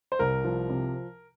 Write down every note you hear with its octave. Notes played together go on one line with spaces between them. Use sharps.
C5
C2 A#4
F3
C3